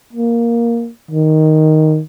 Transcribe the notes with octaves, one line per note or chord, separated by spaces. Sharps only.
A#3
D#3